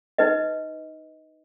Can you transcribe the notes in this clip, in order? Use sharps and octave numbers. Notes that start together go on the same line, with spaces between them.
D#4 B4 D#5